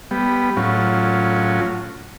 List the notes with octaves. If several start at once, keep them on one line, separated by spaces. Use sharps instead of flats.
G3 B3
A2 F#3 C#4 F4